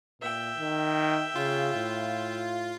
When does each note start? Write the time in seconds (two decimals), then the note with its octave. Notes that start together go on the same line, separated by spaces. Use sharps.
0.22 A#2 E5 G5
0.57 D#3
1.36 C#3 F4
1.74 A2